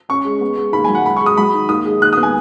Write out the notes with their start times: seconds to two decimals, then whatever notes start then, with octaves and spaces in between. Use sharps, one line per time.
0.09 C#4 C#6
0.25 G#3
0.41 B3
0.57 G#3
0.73 D#2 B5
0.85 F#3 G#5
0.95 F#5
1.05 C#2 B5
1.16 C#6
1.21 G#3
1.26 D#6
1.37 F#3 B5
1.54 D#3
1.69 D#2 D#6
1.85 G#3
2.01 D#2 F#6
2.13 B3 D#6
2.23 G#5